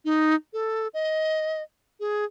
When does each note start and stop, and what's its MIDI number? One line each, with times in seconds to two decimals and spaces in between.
0.05 0.35 63
0.53 0.88 69
0.94 1.62 75
2.00 2.25 68